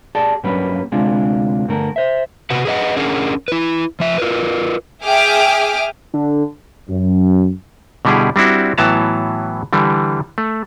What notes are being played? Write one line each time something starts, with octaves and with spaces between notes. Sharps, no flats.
G4 G#4 D5 A5
G2 F#3 G3 A#3 C#4 B4
D2 C3 G#3 D4 F4
G2 D3 A3 A#4
C5 E5
C3 F#4 B4 F#5
G#4 B4 D#5 F#5
C#4 D4 G#4 A#4 F#5
E4 B4
F3 E5
F4 A#4 B4
G#4 E5 G5 D6 D#6 F6
D3
F#2
B2 D3 G3 E4 G4 G#4
G3 C4 D4 E4 F#4
A2 E3 F#3 B3 A5 A#5
D3 E3 G3
A3